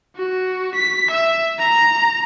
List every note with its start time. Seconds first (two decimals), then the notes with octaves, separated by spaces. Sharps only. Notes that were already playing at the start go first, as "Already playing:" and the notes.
0.16 F#4
0.75 B6
1.11 E5
1.59 A#5